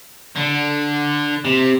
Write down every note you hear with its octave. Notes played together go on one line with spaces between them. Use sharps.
D3
C3